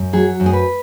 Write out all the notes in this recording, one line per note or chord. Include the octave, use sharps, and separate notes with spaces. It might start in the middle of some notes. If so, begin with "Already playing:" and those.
Already playing: F#2
F#3 G#4
F#2
G#4
B4